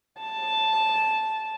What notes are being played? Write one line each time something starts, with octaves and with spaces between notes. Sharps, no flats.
A5